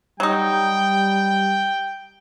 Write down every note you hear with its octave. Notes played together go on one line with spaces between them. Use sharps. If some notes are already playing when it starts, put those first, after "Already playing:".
F#3 G3 D#4 G5